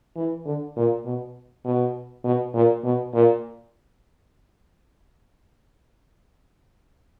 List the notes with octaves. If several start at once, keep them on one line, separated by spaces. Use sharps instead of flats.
E3
D3
A#2
B2
B2
B2
A#2
B2
A#2